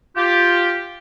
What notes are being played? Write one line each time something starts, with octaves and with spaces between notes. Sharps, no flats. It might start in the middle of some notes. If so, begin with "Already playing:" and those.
F4 G4